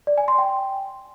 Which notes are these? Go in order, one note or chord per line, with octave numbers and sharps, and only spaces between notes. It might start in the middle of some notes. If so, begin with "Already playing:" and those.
D5
G#5
C6
G5